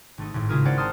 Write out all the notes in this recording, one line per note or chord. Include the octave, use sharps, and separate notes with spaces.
G#1 A3 D#4
G#1 A2
C#3 G#3 E4 F4 G#4 A#4
C4 C#4 C5 D5 F#5
F#5 A5 A#5 C6 D#6 F6